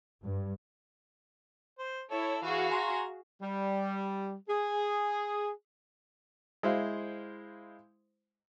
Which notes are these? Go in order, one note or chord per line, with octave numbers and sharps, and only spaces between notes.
G2
C5
E4 A4 C#5
E3 F#4 G#4 F5
G#5 A#5 C6
G3
G#4
G#3 E4 C5 F5